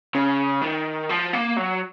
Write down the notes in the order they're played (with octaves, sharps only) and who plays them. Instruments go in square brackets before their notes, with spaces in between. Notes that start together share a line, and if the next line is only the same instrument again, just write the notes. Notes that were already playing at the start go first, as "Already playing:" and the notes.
[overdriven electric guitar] C#3
D#3
F3
A#3
F#3